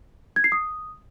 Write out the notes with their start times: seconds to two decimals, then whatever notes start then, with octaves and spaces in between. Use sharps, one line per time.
0.36 G#6
0.44 C7
0.52 D#6